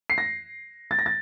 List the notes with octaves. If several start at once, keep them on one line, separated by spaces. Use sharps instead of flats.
C7
A#6
A6
A#6
A6